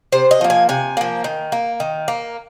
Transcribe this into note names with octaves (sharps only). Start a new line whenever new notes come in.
C3 C5
D#5
F3 A#3
G#5
C3 G#5
F3 A#3
D#3
A#3
D#3
A#3